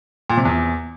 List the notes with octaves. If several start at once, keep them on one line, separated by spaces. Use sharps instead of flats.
A#2
C3
E2